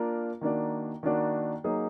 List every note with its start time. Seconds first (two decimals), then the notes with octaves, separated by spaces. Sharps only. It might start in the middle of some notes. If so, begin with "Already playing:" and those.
Already playing: A#3 D4 F4 A#4
0.41 D#3 A#3 D4 F#4 D5
1.03 D#3 A#3 D4 F#4 D5
1.64 F#3 A#3 D#4 G#4